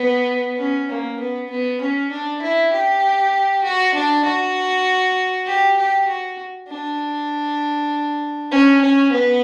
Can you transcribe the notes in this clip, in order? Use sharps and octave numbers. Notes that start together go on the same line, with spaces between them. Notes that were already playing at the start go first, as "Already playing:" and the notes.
Already playing: B3
C#4
A#3
B3
B3
C#4
D4
E4
G4
F#4
D4
F#4
G4
G4
F#4
D4
C#4
C#4
B3